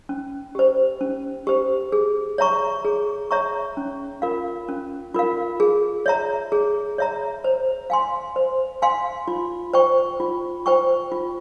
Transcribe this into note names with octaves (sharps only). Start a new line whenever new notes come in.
C#4
G4 C5
C#4
G4 C5
G#4
C#5 E5 A#5 C#6
G#4
C#5 E5 A#5 C#6
C#4
F4 A#4 F5
C#4
F4 A#4 F5
G#4
C#5 E5 A#5
G#4
C#5 E5 A#5
C5
F5 G#5 C6
C5
F5 G#5 C6
F4
C5 G5 C#6
F4
C5 G5 C#6
F4